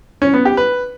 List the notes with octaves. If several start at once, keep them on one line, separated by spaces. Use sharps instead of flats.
C#4
B3
G4
B4